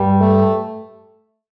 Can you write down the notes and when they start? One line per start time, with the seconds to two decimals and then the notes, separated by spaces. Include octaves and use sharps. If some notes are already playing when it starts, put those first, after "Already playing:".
Already playing: G2 G3
0.21 A3